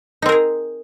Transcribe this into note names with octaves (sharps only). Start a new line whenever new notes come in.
C4 D#4 G#4 A#4